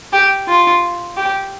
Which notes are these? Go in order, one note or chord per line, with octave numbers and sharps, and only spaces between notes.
G4
F4
G4